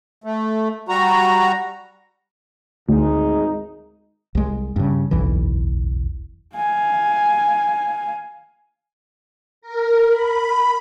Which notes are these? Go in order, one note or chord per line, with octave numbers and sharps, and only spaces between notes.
A3
G3 F#4 A#5
G#1 D2 G#3 D#4
C2 G#3
G2 C#3
F#1 B1 E2 E3
F5 G#5
A#4
B5